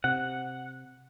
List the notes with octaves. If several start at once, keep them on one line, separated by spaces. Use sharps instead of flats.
C3 F#5